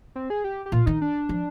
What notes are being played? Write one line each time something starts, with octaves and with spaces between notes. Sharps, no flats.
C4
G#4
G4
G4
A#2 F4
D#3 D#4
D4
F3